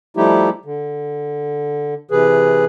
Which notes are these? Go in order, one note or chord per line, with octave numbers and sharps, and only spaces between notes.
F3 G3 A3 D#4 E4 G4
D3
C3 E3 G#4 B4